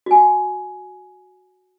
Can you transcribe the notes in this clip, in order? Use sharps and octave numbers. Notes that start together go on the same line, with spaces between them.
F#4 G#5